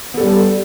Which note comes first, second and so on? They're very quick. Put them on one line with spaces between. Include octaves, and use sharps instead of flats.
B3 A4 G3